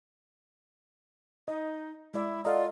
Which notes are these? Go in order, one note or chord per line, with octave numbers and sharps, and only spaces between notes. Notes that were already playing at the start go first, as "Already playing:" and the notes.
D#4 D#5
G#3 E4 D5 E5
F4 A4 D5 D#5 F5 F#5 A#5